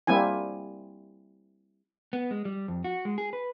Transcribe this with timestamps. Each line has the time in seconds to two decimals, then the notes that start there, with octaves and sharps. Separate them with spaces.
0.07 G3 A#3 C4 E4 G#5
2.13 B3
2.31 G#3
2.45 G3
2.68 F2
2.84 F#4
3.05 G#3
3.18 G#4
3.33 B4